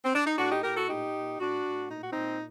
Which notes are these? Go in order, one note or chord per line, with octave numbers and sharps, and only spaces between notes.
C4
D4
D#4
A2 D4 F#4
D#4 G4
A2 G4 A#4
F#4 A4
A#2 D#4 G4
A#2
A2 D4 F#4
A2
A#2 D#4
F#4
A#2 C4 D#4